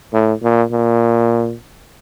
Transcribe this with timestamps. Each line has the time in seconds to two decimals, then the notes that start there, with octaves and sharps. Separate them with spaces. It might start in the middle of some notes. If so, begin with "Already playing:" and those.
0.13 A2
0.43 A#2
0.72 A#2